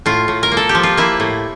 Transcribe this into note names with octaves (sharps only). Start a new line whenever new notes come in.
A2 F4
A2
A#4
A#3
A4
G4
F3
F4
A#3 E4
A2